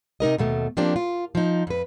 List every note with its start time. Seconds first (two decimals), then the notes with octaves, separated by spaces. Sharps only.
0.20 C3 D#4 A#4 D#5
0.38 D#2 B2 A3
0.77 F3 A#3 C4 D4 G4
0.96 F4
1.35 F3 D#4
1.67 F2 B4